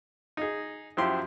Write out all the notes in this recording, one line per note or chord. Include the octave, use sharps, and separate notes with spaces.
D#4 G#4
F#2 F3 E4 G4 C6